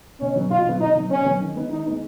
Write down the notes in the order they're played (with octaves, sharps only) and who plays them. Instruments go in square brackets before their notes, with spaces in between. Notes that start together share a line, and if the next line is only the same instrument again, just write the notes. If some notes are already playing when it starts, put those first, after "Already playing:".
[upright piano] B2 [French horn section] C#4
[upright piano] F#3 B3
[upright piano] B2 [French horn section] F4
[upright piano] F#3 B3
[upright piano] B2 [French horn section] D#4
[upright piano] F#3 B3
[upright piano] B2 [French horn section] C#4
[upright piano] F#3 B3
D#3
G#3 B3 D#4
[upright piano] D#3 [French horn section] D#4
[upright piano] G#3 B3 D#4